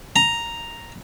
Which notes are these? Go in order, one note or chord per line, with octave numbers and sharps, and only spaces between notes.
A#5